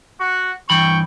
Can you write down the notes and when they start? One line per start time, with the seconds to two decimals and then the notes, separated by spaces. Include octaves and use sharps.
0.20 F#4 F#5 C#6
0.70 G2 E3 G5 B5 C#6